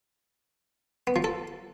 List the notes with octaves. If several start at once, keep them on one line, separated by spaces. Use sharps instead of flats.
B3
F3
A4